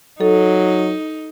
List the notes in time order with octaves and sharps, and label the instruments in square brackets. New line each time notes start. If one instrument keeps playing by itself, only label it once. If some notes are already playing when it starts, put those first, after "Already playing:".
[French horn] F#3 [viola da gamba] D#4 [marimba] A4